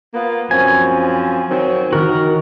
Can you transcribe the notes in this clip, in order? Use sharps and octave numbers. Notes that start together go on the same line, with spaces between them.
A#3 B3 F4
F#2 F3 C4 G#5
D#3 F#3 C4
D#3 F#4 A#4